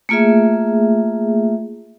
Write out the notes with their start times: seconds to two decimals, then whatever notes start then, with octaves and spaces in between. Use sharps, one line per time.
0.09 A3 A#3 F4 G#4 E5